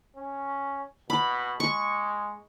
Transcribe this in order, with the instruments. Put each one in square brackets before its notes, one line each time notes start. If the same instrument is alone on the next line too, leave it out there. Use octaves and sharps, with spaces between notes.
[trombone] C#4
[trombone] B2 [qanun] B5
[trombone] G#3 [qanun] C#6